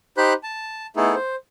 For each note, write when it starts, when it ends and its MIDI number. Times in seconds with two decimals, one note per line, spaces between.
0.17 0.33 63
0.17 0.33 67
0.17 0.33 72
0.17 0.33 83
0.17 0.33 90
0.43 0.86 81
0.96 1.15 57
0.96 1.15 59
0.96 1.15 63
0.96 1.15 64
0.96 1.15 68
0.96 1.15 69
1.15 1.35 72